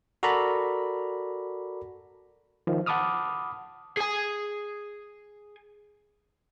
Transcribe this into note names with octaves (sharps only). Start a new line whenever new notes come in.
F#4 A4 A#4 D5 A#5 B5
D#3 F3
F#5 A5 B5 D6 D#6 F6
G#4 G#5